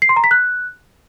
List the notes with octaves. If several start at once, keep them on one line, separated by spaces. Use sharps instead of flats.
C7
C6
A#5
B6
F#6